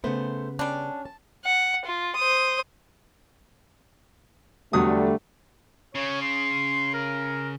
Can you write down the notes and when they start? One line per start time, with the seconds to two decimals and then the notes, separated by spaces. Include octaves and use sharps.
0.04 C#3 A3 B3 C5
0.59 G3 C#4 D4
1.05 A5
1.44 F#5
1.86 F4
2.16 C5 D#6
4.73 E2 D3 F#3 G3 A3 D#6
5.95 C#3 C#5
6.22 C6
6.94 A#4